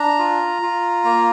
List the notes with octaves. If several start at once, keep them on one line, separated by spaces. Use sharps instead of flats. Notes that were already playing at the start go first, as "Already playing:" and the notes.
Already playing: D4 A#5
F4
F4
A#3